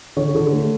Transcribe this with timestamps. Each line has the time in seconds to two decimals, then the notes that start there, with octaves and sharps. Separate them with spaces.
0.17 D3 C#5
0.35 D3
0.52 A3